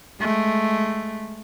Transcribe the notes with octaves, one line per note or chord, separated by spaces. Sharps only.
G#3 A3